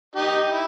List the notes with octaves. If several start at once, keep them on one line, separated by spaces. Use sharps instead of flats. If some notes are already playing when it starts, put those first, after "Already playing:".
D#4 G4
E4